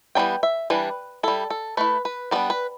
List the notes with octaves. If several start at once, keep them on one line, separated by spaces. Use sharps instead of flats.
E3 G3 B3 D4 G5
E5
E3 G3 D4 B4
G3 E4 A4
A4
A3 E4 B4
B4
G3 B3 D4 D5
B4